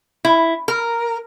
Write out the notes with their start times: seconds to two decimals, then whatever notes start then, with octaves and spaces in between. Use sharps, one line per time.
0.25 E4
0.68 A#4